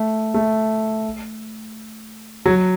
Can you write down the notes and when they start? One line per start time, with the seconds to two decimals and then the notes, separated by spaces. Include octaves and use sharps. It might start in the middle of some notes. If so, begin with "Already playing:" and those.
Already playing: A3
0.34 A3
2.46 F#3